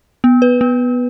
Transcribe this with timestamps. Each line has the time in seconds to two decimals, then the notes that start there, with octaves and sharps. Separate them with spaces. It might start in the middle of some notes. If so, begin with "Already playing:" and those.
0.24 B3
0.42 B4
0.61 B3